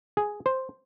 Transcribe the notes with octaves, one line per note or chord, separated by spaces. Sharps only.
G#4
C5